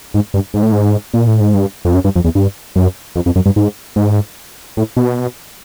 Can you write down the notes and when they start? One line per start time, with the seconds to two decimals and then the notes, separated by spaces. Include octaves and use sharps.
0.14 G#2
0.34 G2
0.54 G#2
0.63 A2
0.72 G#2
1.14 A#2
1.27 A2
1.40 G#2
1.54 G2
1.85 F2
1.95 F#2
2.04 G2
2.16 F2
2.24 E2
2.35 G2
2.76 F#2
3.16 F2
3.26 F2
3.36 F#2
3.46 G2
3.56 G#2
3.96 G#2
4.77 A2
4.97 B2